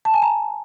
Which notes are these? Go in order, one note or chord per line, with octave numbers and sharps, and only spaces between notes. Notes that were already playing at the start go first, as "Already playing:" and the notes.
A5
G#5
A#5